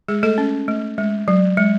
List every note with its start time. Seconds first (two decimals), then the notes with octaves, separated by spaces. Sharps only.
0.08 G#3 G#4
0.23 A3 A4
0.38 C#4
0.68 A3
0.98 G#3
1.28 F#3
1.57 G#3